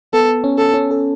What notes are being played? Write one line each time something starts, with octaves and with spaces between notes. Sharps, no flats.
B3 A4
C#4
A4
C#4
A4